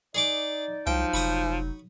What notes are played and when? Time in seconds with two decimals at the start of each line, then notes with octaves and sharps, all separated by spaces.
0.15 D#4 G#4 D5 C#6 D6
0.87 C2 F3 F#3 D#4 G5
1.14 F1 B5 C#6 D#6